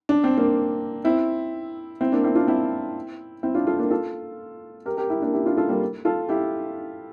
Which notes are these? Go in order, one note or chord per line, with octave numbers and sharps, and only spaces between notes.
D4
C4
A#3 D4
C4 E4
C4 E4
A#3 D4
C4 E4
D4 F4
C4 E4
C4 E4
D4 F4
F4 A4
A#3 D4
F4 A4
G4 A#4
G4 A#4
E4 G4
A#3 D4
E4 G4
D4 F4
F4 A4
G3 A#3
F4 A4
E4 G4